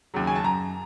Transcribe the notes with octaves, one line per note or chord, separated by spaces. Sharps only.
D#2 C#3 F#3
G#5
A5
F#2 A#5